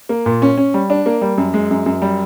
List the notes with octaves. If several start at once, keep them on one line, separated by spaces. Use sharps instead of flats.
A#3
A#2
C#4
C#4
G3
D4
A#3
G3
F#2
G#3
F#2
F#2
G3